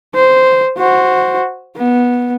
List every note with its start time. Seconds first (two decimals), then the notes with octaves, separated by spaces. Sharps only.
0.15 C5
0.78 F#4 C5
1.77 B3